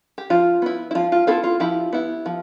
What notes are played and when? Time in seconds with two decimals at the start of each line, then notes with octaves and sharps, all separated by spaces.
0.18 G4
0.30 F3 F4
0.62 B3 E4
0.91 E4
0.95 F3 F4
1.12 F4
1.27 B3 E4 F4 A4
1.44 F4
1.60 F3 E4 G4
1.93 B3 E4
2.26 F3